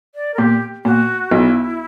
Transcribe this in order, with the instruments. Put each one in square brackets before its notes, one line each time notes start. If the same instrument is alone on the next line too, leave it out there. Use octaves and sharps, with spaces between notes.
[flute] D5
A#4
[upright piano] A#2 [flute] G4
[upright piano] A#2 [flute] F#4
[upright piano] B1 B2 [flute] E4